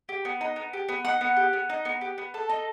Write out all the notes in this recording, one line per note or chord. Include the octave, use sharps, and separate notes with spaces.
G4
B3
D#4
B3
G4
B3
D#4 F#5
B3
G4
B3
D#4
B3
G4
B3
A4
D#4